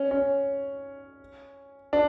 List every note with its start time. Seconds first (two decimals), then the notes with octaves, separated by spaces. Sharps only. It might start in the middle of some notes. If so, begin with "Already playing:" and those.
Already playing: C#4
0.11 C#4
1.93 D4